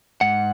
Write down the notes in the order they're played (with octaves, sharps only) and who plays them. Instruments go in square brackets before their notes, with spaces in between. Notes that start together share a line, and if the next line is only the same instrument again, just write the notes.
[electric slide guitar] G#2 F#5